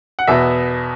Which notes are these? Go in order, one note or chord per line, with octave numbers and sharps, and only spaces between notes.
F#5
E2 B2 B3 E5